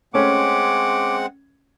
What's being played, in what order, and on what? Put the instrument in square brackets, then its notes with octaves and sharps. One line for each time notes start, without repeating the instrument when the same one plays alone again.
[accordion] G#3 C4 F#5 [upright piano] A3 C#4 [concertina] D6